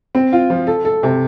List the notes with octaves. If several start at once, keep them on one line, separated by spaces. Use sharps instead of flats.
C4
F4
F3
A4
A4
C3